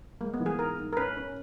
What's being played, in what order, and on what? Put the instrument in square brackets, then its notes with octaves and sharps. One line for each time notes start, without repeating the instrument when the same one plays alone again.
[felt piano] G#3 [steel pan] A#3
[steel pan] B3
[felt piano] E3
[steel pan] G#4
[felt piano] G#2 [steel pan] A#4
[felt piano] G#2
[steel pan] A#4
[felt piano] C#4 [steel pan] B4
[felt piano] C#4